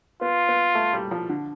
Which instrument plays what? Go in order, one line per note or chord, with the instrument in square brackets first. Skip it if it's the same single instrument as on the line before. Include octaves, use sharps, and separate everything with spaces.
[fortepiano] B3 [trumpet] F4
[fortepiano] B3
A3
G3
F3
D3